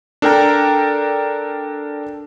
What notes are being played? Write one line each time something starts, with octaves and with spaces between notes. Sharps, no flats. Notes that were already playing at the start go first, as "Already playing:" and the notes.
D4 A4 A#4 G5 A#5